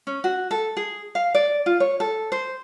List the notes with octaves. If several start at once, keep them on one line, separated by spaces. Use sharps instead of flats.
C#4
F#4
A4
G#4
F5
D5
F4
C#5
A4
C5